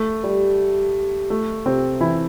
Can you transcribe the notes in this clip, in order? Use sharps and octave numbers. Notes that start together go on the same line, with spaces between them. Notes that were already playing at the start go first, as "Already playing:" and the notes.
Already playing: A3
G3
A3
C3 C4
E3 E4